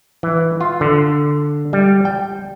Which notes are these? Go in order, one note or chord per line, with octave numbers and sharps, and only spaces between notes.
E3
F4
D3
G3
G5